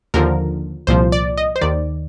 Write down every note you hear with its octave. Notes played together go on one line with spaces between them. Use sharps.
D#2 D3 F3 A#4
C2 A#2 F3 C5
D5
D#5
C5
D#2 D#3 D5